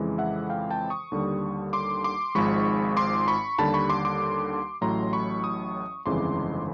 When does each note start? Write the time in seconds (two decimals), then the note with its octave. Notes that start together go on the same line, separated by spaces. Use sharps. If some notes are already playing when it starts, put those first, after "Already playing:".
Already playing: F2 C#3 E3 G#3
0.18 E5 F#5
0.50 F5 G5
0.71 G5 A5
0.90 C#6 D#6
1.12 D#2 D3 G3
1.73 C6 D6
2.04 C6 D6
2.35 G#1 G#2 F3 G#3 B5 C#6
2.97 C6 D6
3.28 B5 C#6
3.58 D#2 D3 G3 A5 B5
3.74 B5 C#6
3.90 C6 D6
4.05 C6 D6
4.81 A1 A2 F#3 A#5 C6
5.13 B5 C#6
5.44 C#6 D#6
6.06 G1 F2 C#3 E3 G#3 C6 D6